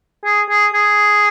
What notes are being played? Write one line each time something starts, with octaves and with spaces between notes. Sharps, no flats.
G#4
G#4
G#4